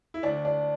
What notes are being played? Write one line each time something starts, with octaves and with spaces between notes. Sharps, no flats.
E4
D2 D4
D4